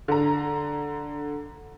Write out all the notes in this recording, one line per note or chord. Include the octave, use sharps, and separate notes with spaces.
D3 A#5